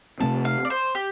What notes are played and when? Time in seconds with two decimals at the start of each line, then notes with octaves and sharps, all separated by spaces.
0.20 C3 A3 C4 A5
0.45 F5
0.65 D5
0.70 C5
0.95 G4